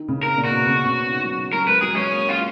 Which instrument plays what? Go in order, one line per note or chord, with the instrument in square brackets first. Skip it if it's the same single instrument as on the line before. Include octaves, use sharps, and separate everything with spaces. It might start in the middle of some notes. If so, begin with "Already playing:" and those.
Already playing: [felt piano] D#3
C#3
[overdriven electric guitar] A#4
[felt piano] A#2
[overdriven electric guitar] F#4
[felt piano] B2
C#3
B2
C#3
D#3
F#3
[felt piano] F#3 [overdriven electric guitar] A#4
[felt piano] G#3 [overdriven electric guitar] B4
[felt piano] F#3 [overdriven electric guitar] G#4
[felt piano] G#3 [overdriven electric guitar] C#4
[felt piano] A#3
[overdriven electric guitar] F4